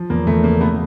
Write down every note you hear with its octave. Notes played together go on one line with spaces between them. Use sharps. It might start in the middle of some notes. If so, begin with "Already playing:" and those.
Already playing: F3
E2 A#3
E2 A3
C#3 A#3
B2 A3 B3